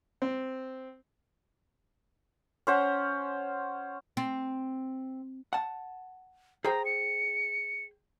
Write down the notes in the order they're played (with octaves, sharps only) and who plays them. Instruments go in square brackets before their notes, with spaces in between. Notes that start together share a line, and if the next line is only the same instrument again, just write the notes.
[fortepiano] C4
[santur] C#4 C5 F#5
[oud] C4
[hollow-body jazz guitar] F#5 A5
[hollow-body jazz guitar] G#4 C5 G5 [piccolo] A#5
[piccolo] C#7